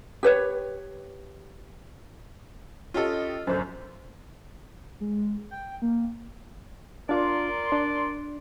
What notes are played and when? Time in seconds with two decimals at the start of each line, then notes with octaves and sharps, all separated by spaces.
0.23 G4 B4 C#5
2.94 C#4 F4 G4 A4 D#5
3.47 G1 F#2 C5
5.01 G#3
5.51 G5
5.82 A#3
7.09 D4 F4 A#4 D5 C6
7.72 D4